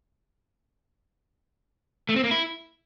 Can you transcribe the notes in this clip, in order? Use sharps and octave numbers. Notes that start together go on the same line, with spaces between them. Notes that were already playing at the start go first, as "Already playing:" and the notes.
A3
C4
A#3
E4